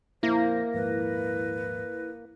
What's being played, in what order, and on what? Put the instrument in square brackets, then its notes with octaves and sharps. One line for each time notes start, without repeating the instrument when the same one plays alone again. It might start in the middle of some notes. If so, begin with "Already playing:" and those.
[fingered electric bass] F2 A#2 [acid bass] A#3 [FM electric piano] E4 A#6 [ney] C5
[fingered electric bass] D#1 G#2 F3 [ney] B4